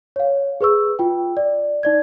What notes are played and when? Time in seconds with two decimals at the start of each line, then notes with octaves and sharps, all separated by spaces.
0.16 C#5 F5
0.61 G#4 B4 C#6 E6
0.99 F4 G5
1.37 D5
1.83 D#4 D5 G#6